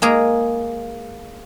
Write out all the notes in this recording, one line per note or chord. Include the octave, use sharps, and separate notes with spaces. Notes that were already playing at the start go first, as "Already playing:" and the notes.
G#3 A#3 G#4 A#5